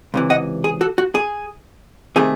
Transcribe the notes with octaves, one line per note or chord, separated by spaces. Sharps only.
C#2 C3 E3
D#5 F#5
G#4
F#4 A4
F#4
G#4
C3 D#3 A3 G#4